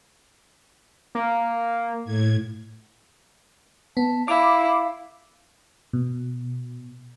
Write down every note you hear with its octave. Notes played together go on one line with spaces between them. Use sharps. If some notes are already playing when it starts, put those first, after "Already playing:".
A#3
A2 G#6
B3 A5
E4 F5 D6
B2